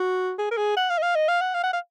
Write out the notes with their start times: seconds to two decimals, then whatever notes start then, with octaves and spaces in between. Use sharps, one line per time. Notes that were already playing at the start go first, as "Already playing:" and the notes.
Already playing: F#4
0.38 G#4
0.51 A#4
0.58 G#4
0.77 F#5
0.90 F5
0.98 D#5
1.03 F5
1.15 D#5
1.29 F5
1.41 F#5
1.54 F5
1.64 F#5
1.73 F5